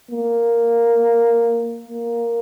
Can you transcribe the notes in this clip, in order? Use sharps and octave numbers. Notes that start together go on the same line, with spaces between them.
A#3
A#3